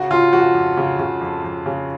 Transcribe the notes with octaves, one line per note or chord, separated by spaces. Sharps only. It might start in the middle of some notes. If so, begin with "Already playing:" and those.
Already playing: C#3 F#4
C#3 F4
F2 F#4
F2
C#3
C#3
F2
F2
C#3